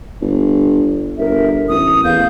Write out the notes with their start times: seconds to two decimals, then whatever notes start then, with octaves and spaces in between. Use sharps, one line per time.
0.22 G1
1.18 G1 A#4 E5
1.69 A1 D#6
2.04 E2 F5 G6